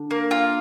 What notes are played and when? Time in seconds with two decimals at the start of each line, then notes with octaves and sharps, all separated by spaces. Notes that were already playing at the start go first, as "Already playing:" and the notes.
Already playing: D3
0.11 A#3
0.31 F4